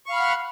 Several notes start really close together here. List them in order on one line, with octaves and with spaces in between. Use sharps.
C#6 F5 B5 F6 F#5